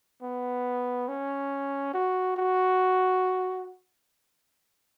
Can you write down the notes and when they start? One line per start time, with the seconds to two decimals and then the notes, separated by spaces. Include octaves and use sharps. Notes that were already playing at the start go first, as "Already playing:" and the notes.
0.22 B3
1.08 C#4
1.94 F#4
2.36 F#4